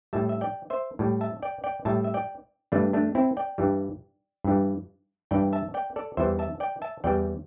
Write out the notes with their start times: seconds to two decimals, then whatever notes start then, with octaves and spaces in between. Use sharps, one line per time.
0.13 A2 G3 E5 A5
0.29 E5
0.41 D5 G5
0.70 C5 E5
0.99 A2 G3
1.21 E5 A5
1.42 D5 G5
1.64 D5 G5
1.85 A2 G3 E5 A5
2.04 E5
2.14 D5 G5
2.72 G2 E3 G3 A3 D4
2.93 A3 D4
3.15 C4 E4
3.37 D5 G5
3.58 G2 E3 G3
4.44 G2 E3 G3
5.31 G2 E3 G3 D5 G5
5.53 E5 A5
5.74 D5 G5
5.96 A4 D5
6.17 E2 E3 G3 C5 E5
6.39 E5 A5
6.60 D5 G5
6.82 E5 A5
7.04 E2 E3 G3 D5 G5